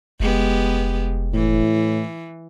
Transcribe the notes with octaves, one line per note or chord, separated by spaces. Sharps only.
F1 G#3 B3 G4
A2 E3